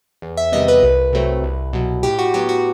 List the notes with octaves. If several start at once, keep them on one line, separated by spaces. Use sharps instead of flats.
E2
E5
C3 D#3 G3 B3 D#5
B4
C2
C3 F#3 A3 C4
C2
B2 F#3
A2 G4
F#4
F#3 B3 G4
F#4